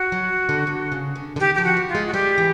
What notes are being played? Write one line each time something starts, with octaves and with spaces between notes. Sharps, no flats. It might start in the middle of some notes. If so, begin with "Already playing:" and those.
Already playing: F#4
F#3
D3
D3
C#3
D3
D3
D#3 G4
F3 G4
F#4
G3
F4
G#3
F#4
G3 G4
E3